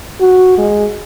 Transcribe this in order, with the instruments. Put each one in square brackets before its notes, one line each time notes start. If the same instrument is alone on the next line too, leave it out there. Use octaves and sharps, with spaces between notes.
[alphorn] F#4
G#3